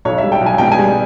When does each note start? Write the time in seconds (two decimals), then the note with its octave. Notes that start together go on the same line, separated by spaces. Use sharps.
0.05 B1 C#5
0.18 G3 E5
0.32 G5
0.41 B1
0.46 G#5
0.58 B2 G5
0.72 G#5
0.78 G3